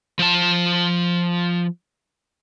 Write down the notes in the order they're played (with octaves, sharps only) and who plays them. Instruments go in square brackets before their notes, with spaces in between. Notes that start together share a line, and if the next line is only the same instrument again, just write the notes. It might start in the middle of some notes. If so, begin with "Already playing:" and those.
[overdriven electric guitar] F3 A5